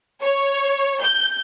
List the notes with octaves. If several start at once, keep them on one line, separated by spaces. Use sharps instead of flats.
C#5
G6